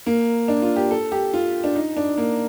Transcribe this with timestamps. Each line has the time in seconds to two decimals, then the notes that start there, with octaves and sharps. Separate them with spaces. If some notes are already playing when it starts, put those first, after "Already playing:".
0.06 A#3
0.48 D4
0.62 F4
0.76 G4
0.91 A4
1.12 G4
1.34 F4
1.64 D4
1.75 D#4
1.97 D4
2.18 A#3